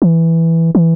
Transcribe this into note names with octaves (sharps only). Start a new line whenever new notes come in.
E3
E3